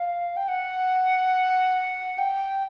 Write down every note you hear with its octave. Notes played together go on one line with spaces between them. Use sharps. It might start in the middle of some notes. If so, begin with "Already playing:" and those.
Already playing: F5
G5
F#5
G5